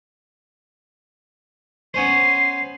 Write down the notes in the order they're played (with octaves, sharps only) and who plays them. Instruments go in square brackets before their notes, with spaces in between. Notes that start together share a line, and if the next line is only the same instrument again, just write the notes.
[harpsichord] B3 C#4 C5 [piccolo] C7